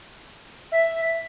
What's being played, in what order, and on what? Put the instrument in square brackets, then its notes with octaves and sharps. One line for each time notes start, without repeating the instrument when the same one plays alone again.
[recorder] E5